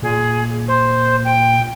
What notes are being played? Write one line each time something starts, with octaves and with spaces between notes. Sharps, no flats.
A#2 G#4
C5
G5